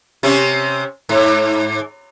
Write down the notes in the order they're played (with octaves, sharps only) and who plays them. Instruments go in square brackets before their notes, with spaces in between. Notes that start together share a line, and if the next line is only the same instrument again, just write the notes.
[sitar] C3 C4 C#4
G#2